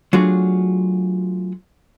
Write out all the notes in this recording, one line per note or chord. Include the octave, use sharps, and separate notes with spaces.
F#3 A3 D4 F4 F#4 G#4